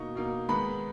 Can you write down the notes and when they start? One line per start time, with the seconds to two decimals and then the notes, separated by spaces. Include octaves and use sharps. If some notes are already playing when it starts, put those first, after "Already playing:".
Already playing: B2 A#3 D#4 C#6
0.15 B2 A#3 D#4
0.49 D#3 G#3 B3 D#4 B5